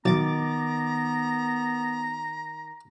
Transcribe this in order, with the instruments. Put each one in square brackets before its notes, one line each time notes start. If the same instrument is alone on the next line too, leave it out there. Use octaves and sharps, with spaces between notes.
[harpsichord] B1 [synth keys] D#3 D6 A6 [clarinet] B3 [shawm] A#5